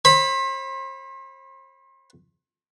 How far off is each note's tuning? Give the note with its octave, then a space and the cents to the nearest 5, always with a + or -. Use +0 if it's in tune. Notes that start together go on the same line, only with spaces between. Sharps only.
C5 +40 B5 +0